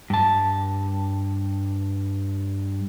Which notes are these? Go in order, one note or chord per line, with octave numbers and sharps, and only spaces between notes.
G2 A5